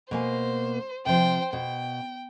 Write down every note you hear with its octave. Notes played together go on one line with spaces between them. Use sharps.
B2 A#3 C5 G#5
C3 F3 C5 G5
B2 G5